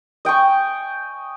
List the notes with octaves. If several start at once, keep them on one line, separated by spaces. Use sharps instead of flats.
D#5 G5 G#5 C#6